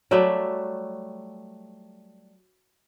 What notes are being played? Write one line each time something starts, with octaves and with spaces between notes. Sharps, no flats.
F#3 G3 A3 E5